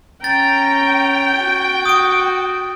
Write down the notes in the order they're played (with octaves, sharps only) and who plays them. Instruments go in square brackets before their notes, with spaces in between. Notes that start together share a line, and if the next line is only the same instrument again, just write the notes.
[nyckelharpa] C#4 A#5 [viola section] G5 [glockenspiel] A6
[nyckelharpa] F#4
[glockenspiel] D#6 D7